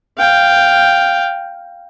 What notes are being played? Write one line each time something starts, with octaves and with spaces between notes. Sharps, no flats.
F5 G5